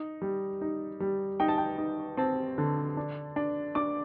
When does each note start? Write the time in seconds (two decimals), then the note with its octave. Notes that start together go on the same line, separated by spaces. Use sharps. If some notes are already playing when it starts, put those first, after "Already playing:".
Already playing: D#4
0.22 G3
0.61 D#4
1.00 G3
1.40 D#4 G5
1.48 A5
1.58 G5
1.78 D#4
2.17 C4 A5
2.58 D3
2.97 D4
3.36 D4
3.75 D4 D6